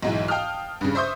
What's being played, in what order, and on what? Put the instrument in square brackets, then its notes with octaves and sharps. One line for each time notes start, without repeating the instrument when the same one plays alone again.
[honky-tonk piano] B1 G#2 E3
F5 G5 A5 D#6 F6
G2 C#3
C5 E5 C6 C#6 D#6 G6